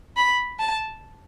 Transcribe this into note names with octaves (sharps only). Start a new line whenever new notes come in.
B5
A5